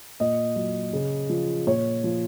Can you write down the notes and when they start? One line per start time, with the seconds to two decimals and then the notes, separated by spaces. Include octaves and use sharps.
0.20 A#2 D#5
0.56 F#3
0.93 C#3
1.29 F3
1.66 A#2 C#5
2.04 F3